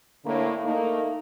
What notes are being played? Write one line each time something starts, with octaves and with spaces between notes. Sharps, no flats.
A2 D3 A#3
A3 A#3 D#4